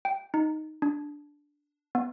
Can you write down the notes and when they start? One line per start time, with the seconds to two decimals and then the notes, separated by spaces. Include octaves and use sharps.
0.05 G5
0.34 D#4
0.82 D4
1.95 B3